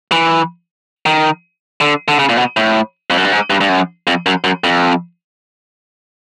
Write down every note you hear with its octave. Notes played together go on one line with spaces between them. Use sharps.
E3
D#3
D3
D3
C#3
A#2
B2
A2
F2
F#2
G2
G#2
G2
G2
F#2
F2
F#2
F#2
F2